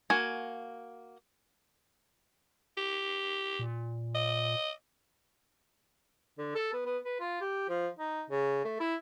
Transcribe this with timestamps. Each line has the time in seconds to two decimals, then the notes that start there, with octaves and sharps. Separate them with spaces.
0.10 A#3 F#4 G#5
2.77 G4
3.59 A#2
4.15 D#5
6.38 D3
6.55 A4
6.73 B3
6.86 B3
7.05 B4
7.20 F4
7.41 G4
7.69 F3
7.99 D#4
8.30 C#3
8.65 A3
8.80 E4